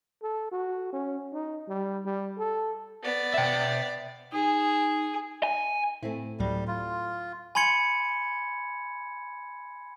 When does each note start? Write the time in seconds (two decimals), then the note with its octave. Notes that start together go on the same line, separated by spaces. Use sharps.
0.23 A4
0.52 F#4
0.93 C#4
1.32 D#4
1.68 G3
2.05 G3
2.38 A4
3.03 B3 D5
3.34 E5 G5
4.32 D#4 G#4
5.43 G#5
6.03 A2 A3 C4 E4
6.40 D2 A2 F#3 G3
6.67 F4
7.55 G#5 B5 C6 G#6 C#7